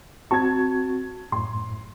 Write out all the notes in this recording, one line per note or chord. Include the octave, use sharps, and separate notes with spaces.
C4 F#4 A5 C#6 G#6
F#2 A2 C6